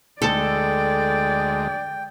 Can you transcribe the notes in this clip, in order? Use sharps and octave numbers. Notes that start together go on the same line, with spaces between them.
D2 G#3 A4 D5 G5